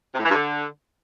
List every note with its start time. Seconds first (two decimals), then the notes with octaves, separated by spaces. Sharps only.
0.14 C3
0.19 A2
0.24 E3
0.29 G2
0.34 D3